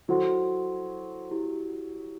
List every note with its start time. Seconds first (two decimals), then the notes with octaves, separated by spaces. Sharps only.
0.08 F#3 E4 A4 C5 F#5 C6
1.31 E4 G4